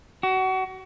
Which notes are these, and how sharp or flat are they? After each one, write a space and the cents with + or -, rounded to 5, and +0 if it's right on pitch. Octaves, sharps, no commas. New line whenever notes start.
F#4 +30